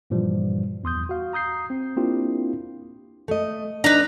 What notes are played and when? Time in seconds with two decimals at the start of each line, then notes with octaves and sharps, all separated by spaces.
0.10 G2 A#2 E3 F3 G3
0.84 E2 C6 D#6 G6
1.09 F#4 F5
1.33 A#5 D#6 G6 C7
1.70 C4
1.97 A#3 C4 D4 E4 F4 G4
3.28 A3 D#5
3.84 D4 D#4 B4 A#5